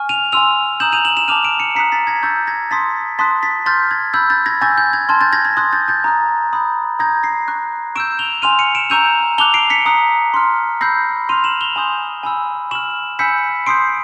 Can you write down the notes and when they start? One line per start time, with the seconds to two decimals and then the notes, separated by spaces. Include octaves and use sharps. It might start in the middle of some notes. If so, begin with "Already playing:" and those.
Already playing: G#5 C#6 F6
0.09 D#7 F7
0.32 G#5 C6 E6 D#7 F7
0.80 A#5 D#6 G6 E7 F#7
0.92 D#7 F7
1.05 E7 F#7
1.17 E7 F#7
1.28 A5 D6 F6 D#7 F7
1.44 D7 E7
1.60 C#7 D#7
1.75 A#5 D#6 F#6 B6 C#7
1.92 A6 B6
2.07 G#6 A#6
2.23 C#6 E6 G6 A6
2.47 G#6 A#6
2.71 A5 C6 D#6 A6 B6
3.18 A5 C6 D#6 F#6 A6 B6
3.43 A6 B6
3.66 C6 F6 G6 A6
3.91 G#6
4.14 B5 E6 G6
4.30 G6 A6
4.46 G#6 A#6
4.61 G#5 C#6 E6 G6 A6
4.78 G6
4.93 G#6
5.09 A5 C6 F6 G#6
5.21 G6 A6
5.33 G#6 A#6
5.45 G#6
5.57 C6 D#6 F#6 G#6
5.73 G6 A6
5.88 G6 A6
6.04 A#5 D#6 F#6
6.53 B5 D#6 G6
6.99 A#5 D#6 G6 G#6 A#6
7.23 A#6 C7
7.48 C#6 F#6
7.95 C#6 E6 G6 D7 E7
8.19 F7 G7
8.42 G#5 C6 F6 D#7 F7
8.59 C#7 D#7
8.75 D7 E7
8.90 A#5 C#6 E6 G6 D#7 F7
9.38 A5 D6 F#6 F7 G7
9.54 C7 D7
9.70 B6 C#7
9.86 A#5 D#6 F#6
10.34 C6 F6
10.81 B5 E6 G6 A#6 C7
11.29 C6 F6 D#7 F7
11.44 E7 F#7
11.61 F7 G7
11.76 G#5 C6 D#6 G6
12.23 G#5 B5 E6
12.71 C#6 F6 E7 F#7
13.19 G#5 B5 E6 G6 B6 C#7
13.66 C6 D#6 G6 C7 D7